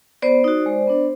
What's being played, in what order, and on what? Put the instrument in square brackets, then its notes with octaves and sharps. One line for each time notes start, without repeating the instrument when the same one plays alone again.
[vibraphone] B3 C5 D5
D#4 F#4
G#3
B3 D4